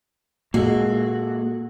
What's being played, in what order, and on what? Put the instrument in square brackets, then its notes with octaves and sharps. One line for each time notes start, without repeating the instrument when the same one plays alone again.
[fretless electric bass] A#2 G#3 [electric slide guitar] A#3 G#4 A4 [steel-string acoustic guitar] F#4